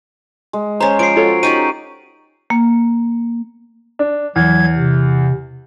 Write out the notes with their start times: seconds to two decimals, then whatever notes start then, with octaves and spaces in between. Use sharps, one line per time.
0.53 G#3
0.80 C#4 C5 A#5
0.99 F3 C7 D7
1.16 F4 F#4 A4 C#5
1.43 C#4 D#4 G4 D5 D#7
2.50 A#3
3.99 D4
4.36 E2 F#3 G#6
4.77 C3